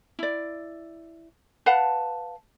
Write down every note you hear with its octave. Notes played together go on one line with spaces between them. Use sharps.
E4 D5
B4 F5 F#5 A5